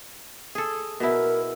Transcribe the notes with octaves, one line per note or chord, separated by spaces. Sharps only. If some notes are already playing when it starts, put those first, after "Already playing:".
G#4 A4
B2 E4 A#4